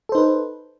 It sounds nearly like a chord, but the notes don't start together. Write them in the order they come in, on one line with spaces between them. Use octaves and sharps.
A4 C5 D#4 B4